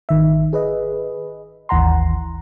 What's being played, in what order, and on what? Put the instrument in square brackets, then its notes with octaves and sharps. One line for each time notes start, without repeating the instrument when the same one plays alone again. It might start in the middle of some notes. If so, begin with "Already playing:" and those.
[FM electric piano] G#1 D#3 E5
G#4 B4 D#5
G#1 D#2 E3 F#5 A#5 C6